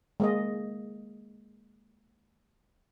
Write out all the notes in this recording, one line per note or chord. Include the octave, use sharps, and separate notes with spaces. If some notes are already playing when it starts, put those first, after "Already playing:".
G#3 A#3 D#5